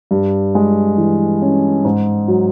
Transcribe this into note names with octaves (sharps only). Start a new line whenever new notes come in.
G2
G#3
E3
C#4
G#2
F#3